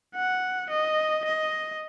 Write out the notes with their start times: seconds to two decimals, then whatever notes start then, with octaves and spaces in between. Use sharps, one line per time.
0.15 F#5
0.70 D#5
1.25 D#5